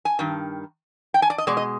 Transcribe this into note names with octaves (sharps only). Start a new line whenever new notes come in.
G#5
G2 D#3
G5
G#5
D5
D#5
B2 G#3 D5
D#5